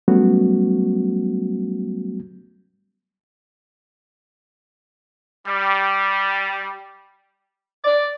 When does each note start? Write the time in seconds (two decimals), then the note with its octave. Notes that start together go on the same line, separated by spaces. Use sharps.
0.08 F#3 G3 A3 B3 C#4 F#4
5.47 G3
7.84 D5